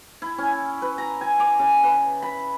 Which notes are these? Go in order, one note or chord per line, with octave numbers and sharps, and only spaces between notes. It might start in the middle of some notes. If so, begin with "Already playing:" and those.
E4
C#4
B4
A#5
G#5
D6
C#3
B4
B5